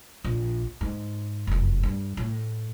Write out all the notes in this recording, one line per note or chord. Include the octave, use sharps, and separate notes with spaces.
A#1
G#2
F1 F#2
G2
A2